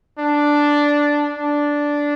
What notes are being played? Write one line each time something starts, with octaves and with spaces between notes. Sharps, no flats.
D4
D4